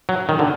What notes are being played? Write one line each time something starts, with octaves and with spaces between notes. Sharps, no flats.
F#3
D#3
D3